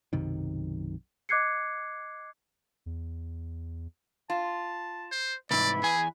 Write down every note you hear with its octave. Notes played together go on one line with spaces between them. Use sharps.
B1 F#2 C3 D#3
D#5 D6 F#6 G#6 C7 C#7
E2
F4 A5
C5
C2 G#2 E3 D5 B5
E2 G#4 G#5